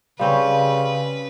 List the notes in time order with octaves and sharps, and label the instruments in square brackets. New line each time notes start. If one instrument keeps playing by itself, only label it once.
[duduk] C#3 [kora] G3 C4 C#4 [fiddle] B4 [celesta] F5